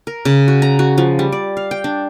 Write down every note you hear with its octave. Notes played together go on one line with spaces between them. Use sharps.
A#4
C#3
F#4
A#5
F#4
F3
G3
D5
F5
G5
D4